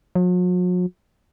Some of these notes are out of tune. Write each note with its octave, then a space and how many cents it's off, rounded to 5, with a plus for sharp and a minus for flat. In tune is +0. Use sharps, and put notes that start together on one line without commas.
F#3 -45